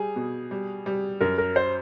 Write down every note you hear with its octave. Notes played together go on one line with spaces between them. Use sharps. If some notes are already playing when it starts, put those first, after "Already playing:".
Already playing: G3 G#4
B2
G3
G3
F#2 A#4
A#4
C5